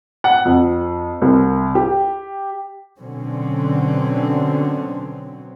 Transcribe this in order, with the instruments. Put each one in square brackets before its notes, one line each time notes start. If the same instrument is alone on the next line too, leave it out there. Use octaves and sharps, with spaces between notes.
[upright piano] F#5
F2
C2
G4
[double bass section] B2 D3 F#3 C4 C#4